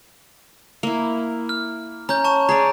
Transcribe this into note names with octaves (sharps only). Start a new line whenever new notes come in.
A#3 E4
F6
C#4 A#5 G6
A5 C#6 E7
G#4 C#5 D5 A#5